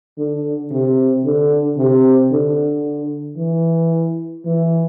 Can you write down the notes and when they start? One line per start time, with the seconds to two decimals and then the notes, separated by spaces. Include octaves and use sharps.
0.18 D3
0.71 C3
1.25 D3
1.78 C3
2.32 D3
3.37 E3
4.46 E3